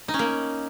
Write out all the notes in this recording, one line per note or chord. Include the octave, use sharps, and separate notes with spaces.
D#4
C#4
A#3